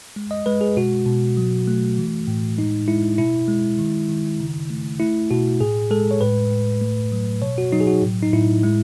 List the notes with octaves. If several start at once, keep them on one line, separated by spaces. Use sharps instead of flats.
G#3
D#5
G#3 B4
G#4
B2 F#4
B2
F#3
A3
E3
A2
G#3 D#4
G#3 E4
B2 E4
G#3
D#3
D#3
C#3
A3
A3 E4
B2 F#4
A2 G#4
G#3 A4
C#5
A2 B4
A2
A3
F#3
B2 C#5
F#4
F#3 D#4
G#4
F#4
A2
D#4
A2 E4
G#3 E4